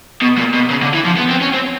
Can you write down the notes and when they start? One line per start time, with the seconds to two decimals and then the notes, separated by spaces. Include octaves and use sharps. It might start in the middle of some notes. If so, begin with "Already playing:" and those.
0.22 B2
0.37 A#2
0.54 B2
0.70 C#3
0.82 D3
0.94 E3
1.06 F3
1.18 B3
1.30 C4
1.42 C#4
1.54 C4